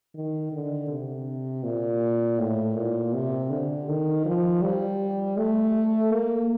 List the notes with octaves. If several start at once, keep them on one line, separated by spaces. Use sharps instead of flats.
D#3
D3
C3
A#2
A2
A#2
C3
D3
D#3
F3
G3
A3
A#3